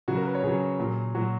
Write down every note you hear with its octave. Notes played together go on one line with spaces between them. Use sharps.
C#3 F#3 F#4
A#4
B4
C#5
C#3 F#3 G#4
A#2 F#3
A#2 F#3 F#4